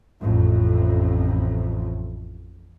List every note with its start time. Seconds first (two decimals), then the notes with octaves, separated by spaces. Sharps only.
0.19 A1 F2 A2